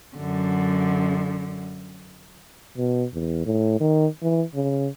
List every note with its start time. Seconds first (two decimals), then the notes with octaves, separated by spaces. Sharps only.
0.16 F#2 D3
2.77 B2
3.13 E2
3.46 A2
3.80 D#3
4.22 E3
4.55 C#3